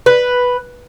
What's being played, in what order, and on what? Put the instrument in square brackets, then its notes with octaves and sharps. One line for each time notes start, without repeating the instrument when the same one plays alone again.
[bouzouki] B4